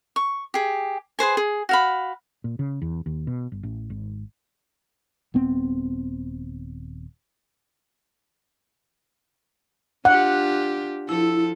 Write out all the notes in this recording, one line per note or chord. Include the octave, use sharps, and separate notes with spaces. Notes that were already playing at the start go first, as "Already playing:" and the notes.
C#6
G4 G#4
G#4 B4 C5 G#5
G#4
F#4 F5 B5
A#2
C#3
E2
D#2
B2
G1
A1
G#1
D#1 B3 C4
D4 F4 G4 F#5
F3 E4 A4